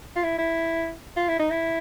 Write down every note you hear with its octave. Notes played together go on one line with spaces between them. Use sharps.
F4
E4
E4
F4
E4
D#4
E4